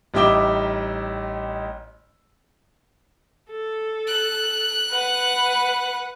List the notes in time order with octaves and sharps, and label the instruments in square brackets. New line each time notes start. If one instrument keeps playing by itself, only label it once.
[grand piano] A1 G3 D#4 E5 D6 G7
[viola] A4
[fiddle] F#6
[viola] B4 F#5